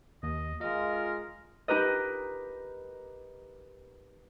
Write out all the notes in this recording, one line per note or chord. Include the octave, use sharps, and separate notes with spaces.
D#2 D#5
G#3 F4 A#4 D#5
D#4 G4 A#4 B4 D#5